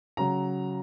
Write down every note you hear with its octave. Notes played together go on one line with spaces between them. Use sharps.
C#3 F#3 A#5